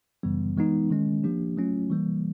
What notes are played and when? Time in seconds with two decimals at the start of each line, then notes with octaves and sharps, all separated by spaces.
0.23 F#2 C#3 E3 G3 B3
0.57 E3 G#3 B3 D#4
0.90 D#3 G#3 C#4
1.23 F3 A#3 D4 G4
1.57 F#3 A3 C#4 F4
1.90 E3 G3 A#3